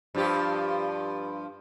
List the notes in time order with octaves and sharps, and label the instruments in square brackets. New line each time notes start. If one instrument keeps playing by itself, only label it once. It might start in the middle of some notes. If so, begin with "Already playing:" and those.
[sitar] G2 F3 G4